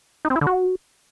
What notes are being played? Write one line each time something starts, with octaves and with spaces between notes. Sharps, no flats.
D#4
C4
E4
D3
F#4